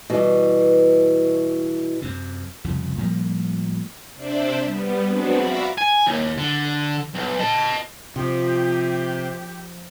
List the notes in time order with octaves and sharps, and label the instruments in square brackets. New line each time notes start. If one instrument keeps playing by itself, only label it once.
[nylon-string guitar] B2 E3 G3
[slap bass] F#2 C3
C2 F2 C#3
A2 F3 G3 A#3
[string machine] C3 D4 C5 D5 E5
G3 B3
F#3 G#3 B3 C4 D4 F#4
F#4 D5 E5 F5 A#5 B5
[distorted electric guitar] G#5
D#2
D3
B1
D#5 A5
[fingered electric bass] C3 [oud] F3 [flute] G4